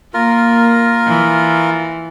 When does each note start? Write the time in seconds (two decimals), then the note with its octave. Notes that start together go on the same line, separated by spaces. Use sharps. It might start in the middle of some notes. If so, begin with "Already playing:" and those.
0.14 A#3 F4 A#4
1.07 E3